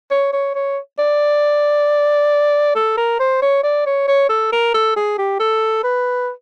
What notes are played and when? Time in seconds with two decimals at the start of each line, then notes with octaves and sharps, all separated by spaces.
0.11 C#5
0.33 C#5
0.55 C#5
0.99 D5
2.76 A4
2.97 A#4
3.20 C5
3.42 C#5
3.64 D5
3.86 C#5
4.08 C#5
4.29 A4
4.53 A#4
4.74 A4
4.97 G#4
5.18 G4
5.40 A4
5.84 B4